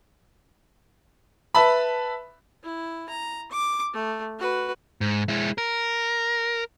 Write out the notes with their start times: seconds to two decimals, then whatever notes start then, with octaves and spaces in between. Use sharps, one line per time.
1.55 B4 E5 A5 B5
2.64 E4
3.09 A#5
3.51 D6
3.94 A3
4.39 F#4 B4
5.01 G#2
5.29 G#3 E4
5.58 A#4